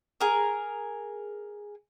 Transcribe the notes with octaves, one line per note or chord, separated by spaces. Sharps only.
G#4 A#4